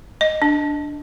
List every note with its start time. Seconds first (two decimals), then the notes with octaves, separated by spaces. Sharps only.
0.21 D#5
0.42 D4